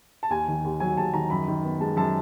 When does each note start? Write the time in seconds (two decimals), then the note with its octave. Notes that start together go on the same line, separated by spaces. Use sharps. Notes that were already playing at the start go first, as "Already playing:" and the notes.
0.23 A5
0.30 D#2 G#5
0.48 D#3
0.65 D#2
0.80 F#3 G#5
0.97 D#2 A5
1.13 D#3 A#5
1.30 F#2 B5
1.48 D#3
1.64 B3
1.80 G#3 A5
1.97 F#2 A5